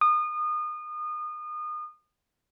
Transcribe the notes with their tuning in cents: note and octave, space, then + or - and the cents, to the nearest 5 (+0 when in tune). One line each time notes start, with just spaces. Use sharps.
D#6 -30